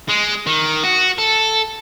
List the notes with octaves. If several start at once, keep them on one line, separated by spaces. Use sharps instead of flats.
G#3
D#3
F#4
A4